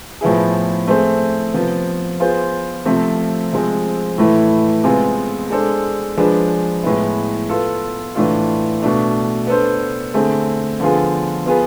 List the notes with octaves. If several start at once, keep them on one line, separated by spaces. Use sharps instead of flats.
A2 F3 B3 E4 G#4
A3 C4 G#4 C5
C3 F3 B3
B3 F4 G#4 C5
C3 F3 A3 C4
C3 F3 G#3 C4
A2 E3 A3 E4
C3 G#3 B3 F4 G#4
G#3 D4 A4 C5
F3 G#3 D4 G#4 B4
A2 G#3 B3 E4
B3 F4 A4
A2 E3 A3 D4 F4
B2 A3 D4
B3 D4 A4 C5
D3 A3 C4 G#4
D3 F3 B3 F4 G#4
B3 F4 G#4 B4